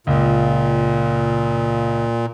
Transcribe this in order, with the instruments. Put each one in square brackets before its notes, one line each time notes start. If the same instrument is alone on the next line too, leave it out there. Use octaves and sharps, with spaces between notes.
[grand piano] C#2 [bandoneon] A#2